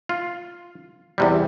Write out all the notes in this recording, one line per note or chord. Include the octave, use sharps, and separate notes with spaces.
F4
E2 C3 G3